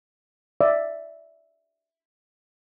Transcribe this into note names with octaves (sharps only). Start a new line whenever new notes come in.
D5 E5 F5